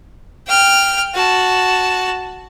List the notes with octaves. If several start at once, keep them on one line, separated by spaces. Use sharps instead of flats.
G5 F6
F#4 A5